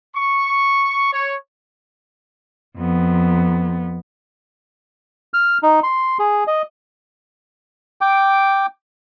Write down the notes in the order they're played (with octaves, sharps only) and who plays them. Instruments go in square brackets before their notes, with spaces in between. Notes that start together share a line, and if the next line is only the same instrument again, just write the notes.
[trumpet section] C#6
C#5
[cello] F2 B3
[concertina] F6
D#4
C6
G#4
D#5
[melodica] G5 D6